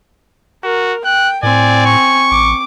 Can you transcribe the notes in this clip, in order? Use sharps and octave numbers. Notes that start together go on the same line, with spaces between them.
F#4 A#4
G5 F#6
A2 C4 D5 G#5
C#6
A1 D6